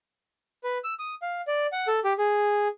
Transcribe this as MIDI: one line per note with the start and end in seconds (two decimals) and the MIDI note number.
0.64 0.78 71
0.84 0.94 88
0.99 1.15 87
1.22 1.41 77
1.47 1.67 74
1.72 1.87 78
1.87 2.00 69
2.04 2.13 67
2.18 2.68 68